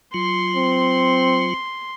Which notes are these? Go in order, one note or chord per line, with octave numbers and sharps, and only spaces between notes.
F#3 F4 C6
C4